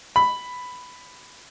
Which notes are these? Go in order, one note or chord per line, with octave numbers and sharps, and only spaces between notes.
B5